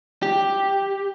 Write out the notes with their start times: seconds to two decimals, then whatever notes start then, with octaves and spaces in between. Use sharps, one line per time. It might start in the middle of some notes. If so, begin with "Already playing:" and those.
0.23 G4